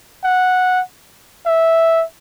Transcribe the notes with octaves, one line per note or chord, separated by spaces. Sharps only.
F#5
E5